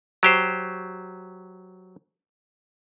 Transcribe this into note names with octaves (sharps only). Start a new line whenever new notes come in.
F#3 G4 C5